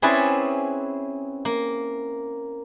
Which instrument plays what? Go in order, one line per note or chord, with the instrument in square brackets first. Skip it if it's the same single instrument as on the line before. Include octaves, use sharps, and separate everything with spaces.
[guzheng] C4 C#4 E4 G#4 B4 D5
A#3